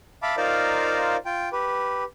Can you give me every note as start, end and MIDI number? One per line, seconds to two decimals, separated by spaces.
0.22 0.35 76
0.22 0.35 77
0.22 0.35 81
0.22 0.35 83
0.22 0.35 86
0.37 1.16 63
0.37 1.16 65
0.37 1.16 70
0.37 1.16 72
0.37 1.16 74
0.37 1.16 77
1.25 1.49 65
1.25 1.49 79
1.52 2.04 67
1.52 2.04 71